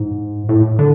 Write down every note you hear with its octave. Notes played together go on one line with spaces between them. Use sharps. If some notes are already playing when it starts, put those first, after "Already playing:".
Already playing: G#2
A2
D3